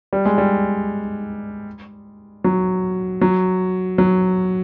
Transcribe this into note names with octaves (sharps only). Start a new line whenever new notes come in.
G3
G#3
G3
F#3
F#3
F#3